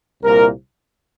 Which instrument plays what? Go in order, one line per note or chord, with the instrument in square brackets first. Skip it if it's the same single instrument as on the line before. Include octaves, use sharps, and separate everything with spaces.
[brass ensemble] C2 A#2 A#4